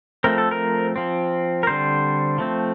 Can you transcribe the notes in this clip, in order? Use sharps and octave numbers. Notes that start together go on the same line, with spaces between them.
F3 A3 C4 A#4
A4
A#4
F3 C4
A#4
D3 G3 C4 C5
F3 A3 C4